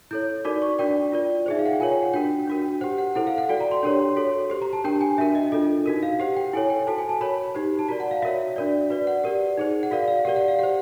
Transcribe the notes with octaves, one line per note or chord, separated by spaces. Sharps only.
E4 A4 C#5 G6
D#4 F#4 A#4 D5 D6
C#6
D4 F#4 A#4 D5 G5
F4 A#4 D5
D#4 G#4 C5 E5
F5
F#5
G5
F4 A#4 C#5 G#5
G5
F#5
D4 F#4 A#4 G5
D4 F#4 A#4
G4 C5 F#5
F#5
E4 A4 C5 F#5
F5
F#5
F#4 A4 D5 G5
A#5
C6
D4 G4 A#4 C#5
F#4 A4 C#5
G4 C5
A#5
A5
D4 G4 A#4 G5
G#5
D4 F#4 A#4 E5
D#5
D4 F4 A4 D#5
D#4 F#4 A#4
F5
G4 C5 F#5
G5
E4 A4 C#5 G#5
G5
F#4 A4 C5 A5
G#5
A5
F#4 A#4 C#5 B5
D#4 G4 C5
A5
F#4 A#4 D5 A#5
F#5
F5
F#4 A#4 C#5 E5
D4 F#4 A#4 D5
F#4 B4 D5
F#5
G4 A#4 D5
D#4 G#4 C5
F#5
F#4 A#4 D5 F5
F5
G4 A#4 D5 F#5
F#5
F5
G4 C5 F#5